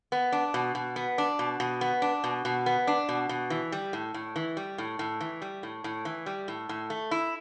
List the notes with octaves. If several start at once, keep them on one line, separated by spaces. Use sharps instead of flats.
B3
D4
B2
B2
B3
D4
B2
B2
B3
D4
B2
B2
B3
D4
B2
B2
E3
G3
A2
A2
E3
G3
A2
A2
E3
G3
A2
A2
E3
G3
A2
A2
A3
E4